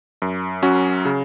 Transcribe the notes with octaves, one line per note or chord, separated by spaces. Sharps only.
F#2
F#3 C#4 F#4
C#3